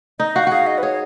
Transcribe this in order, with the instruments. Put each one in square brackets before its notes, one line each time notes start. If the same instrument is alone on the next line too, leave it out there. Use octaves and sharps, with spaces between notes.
[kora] D#4 [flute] D#5
[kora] F#4 [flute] F5
[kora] F#4 G#4 [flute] F5
[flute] D#5
B4
[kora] G#4 [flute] C#5